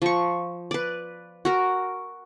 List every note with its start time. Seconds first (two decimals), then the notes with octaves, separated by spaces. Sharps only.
0.02 F3 C#6
0.71 B4 D5
1.45 F#4 A#4